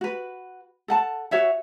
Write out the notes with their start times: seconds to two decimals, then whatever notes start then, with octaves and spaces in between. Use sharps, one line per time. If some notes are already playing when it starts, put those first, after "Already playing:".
0.01 F#4 B4
0.88 A4 F#5 A5
1.31 F#4 C#5 E5 F#5